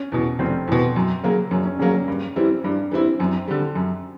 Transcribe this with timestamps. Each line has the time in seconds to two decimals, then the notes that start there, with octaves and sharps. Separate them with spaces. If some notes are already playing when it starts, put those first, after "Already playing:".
Already playing: C#4
0.12 E2 B2
0.39 F1 C4
0.68 E2 B2
0.96 F#2
1.23 C#3 F#3 A#3
1.51 F#2 C#4
1.65 C#4
1.79 C#3 F#3 A#3 C#4
1.94 C#4
2.08 G2
2.36 E3 G3 C4 E4
2.64 G2 D4
2.91 E3 G3 C4 E4
3.19 F#2 C4
3.48 D3 G3
3.75 F#2